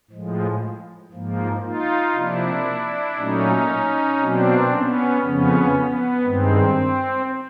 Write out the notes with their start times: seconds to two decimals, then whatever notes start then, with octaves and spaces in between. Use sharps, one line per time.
0.10 A2 F3 G#3
1.12 G#2 F3 A#3
1.63 D#4 F4
2.14 C3 F3 A#3 D4 E4
3.17 A#2 F#3 A3 C#4 D#4
4.19 B2 F#3 A#3 C4 D4
4.70 B3 C#4
5.21 F2 C#3 F3 B3 C#4
5.72 B3
6.24 G2 D#3 G#3 C4